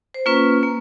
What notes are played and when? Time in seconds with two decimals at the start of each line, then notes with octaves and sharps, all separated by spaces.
0.14 C5
0.26 A#3 C#4 F4 B4
0.63 A#3